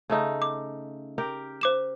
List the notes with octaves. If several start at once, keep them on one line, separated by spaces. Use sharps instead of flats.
C#3 A3 D#4
D6
G4 A#4
C5 D6 E7